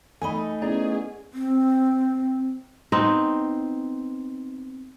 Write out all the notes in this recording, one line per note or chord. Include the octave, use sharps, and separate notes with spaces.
A3 D#4 D#5 G#5 B5
B3 C#4 E4 G#4 D5 A#5
C4
B3 C4 D#4